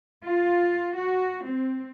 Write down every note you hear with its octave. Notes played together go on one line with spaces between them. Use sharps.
F4
F#4
C4